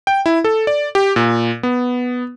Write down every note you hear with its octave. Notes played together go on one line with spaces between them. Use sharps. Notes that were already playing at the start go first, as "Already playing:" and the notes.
G5
E4
A4
D5
G4
A#2
B3